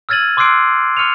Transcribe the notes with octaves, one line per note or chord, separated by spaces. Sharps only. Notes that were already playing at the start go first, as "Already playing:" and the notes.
E6 F6 G#6 A6 D#7 F#7
C6 D6 E6 F#6 C7 D7
C#6 F6 C#7 D#7 F7